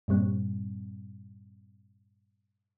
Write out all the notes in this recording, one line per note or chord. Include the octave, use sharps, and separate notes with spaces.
G2 A#2 G3 C4